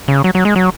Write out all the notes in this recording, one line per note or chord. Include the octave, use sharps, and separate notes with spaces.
C#3
F#3
F#3
G#3
F#3